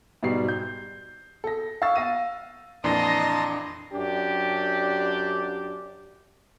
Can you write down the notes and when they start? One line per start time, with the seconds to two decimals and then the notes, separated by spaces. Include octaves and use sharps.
0.23 G#2 B2 G3 C7
0.48 G6
1.44 A4 A#6
1.82 F5 C#6 E6 A6
1.96 F5 A#6 D#7
2.84 F2 A#2 E3 D4 D#5 A5 A#5 C6
3.94 F#2 D4 G4